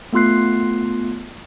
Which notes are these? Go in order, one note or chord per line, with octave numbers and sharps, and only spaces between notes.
A3 B3 F4 C6 F#6 C7